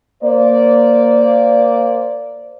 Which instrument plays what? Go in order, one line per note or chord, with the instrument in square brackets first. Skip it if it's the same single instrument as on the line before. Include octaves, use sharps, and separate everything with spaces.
[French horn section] A#3 C5 D5